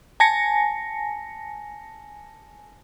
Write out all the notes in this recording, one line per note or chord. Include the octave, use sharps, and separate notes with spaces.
G#5 A5 A#6 C#7